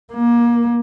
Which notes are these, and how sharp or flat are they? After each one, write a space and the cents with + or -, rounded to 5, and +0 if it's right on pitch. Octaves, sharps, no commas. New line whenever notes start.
A#3 +25